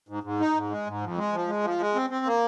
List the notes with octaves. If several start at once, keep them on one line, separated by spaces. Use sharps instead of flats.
G#2
G#2
D#4
G#2
G#3
G#2
F2
G#3
F3
G#3
F3
G#3
C4
C4
A#3